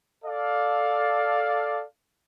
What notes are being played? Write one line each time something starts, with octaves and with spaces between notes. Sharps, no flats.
A4 D5 F5